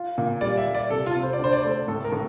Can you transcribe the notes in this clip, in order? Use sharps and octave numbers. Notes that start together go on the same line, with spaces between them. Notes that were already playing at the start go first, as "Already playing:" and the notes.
Already playing: F4
A#2
G3 D5
E5
G3
D5
C3 A4
F4
C3
C5
D5
D2 C5
D5
A3 C5
A2 A4
A#4
A2